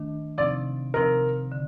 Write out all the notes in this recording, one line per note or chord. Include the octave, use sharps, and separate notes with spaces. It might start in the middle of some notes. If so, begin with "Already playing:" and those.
Already playing: D#3 A3 D4
C3 F3 C4 D#4 D5
C3 F3 C4 D#4 A#4
D3